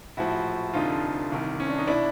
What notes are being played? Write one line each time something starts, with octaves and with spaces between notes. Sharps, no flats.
A#1 A2 F3 E4 F#4
F1 F2 D3 F3 D#4 F4
C2 C3 D#3
C#4
D4
D#4
B2 D4 E4